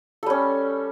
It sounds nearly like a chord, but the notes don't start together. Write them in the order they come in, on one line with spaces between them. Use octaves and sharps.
A4 G3 C#4